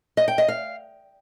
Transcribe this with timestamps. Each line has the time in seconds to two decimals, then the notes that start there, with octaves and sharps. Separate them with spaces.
0.17 D#5
0.28 G5
0.38 D#5
0.48 F5